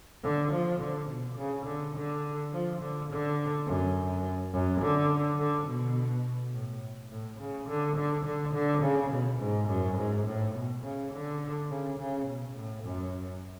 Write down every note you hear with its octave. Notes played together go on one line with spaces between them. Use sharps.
D3
F3
D3
B2
C#3
D3
D3
F3
D3
D3
F#2
F#2
D3
D3
B2
A2
A2
C#3
D3
D3
D3
D3
C#3
B2
G#2
F#2
G#2
A2
B2
C#3
D3
C#3
C#3
B2
A2
F#2